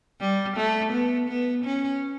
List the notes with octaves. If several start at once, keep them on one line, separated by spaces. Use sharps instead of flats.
G3
A3
B3
B3
C#4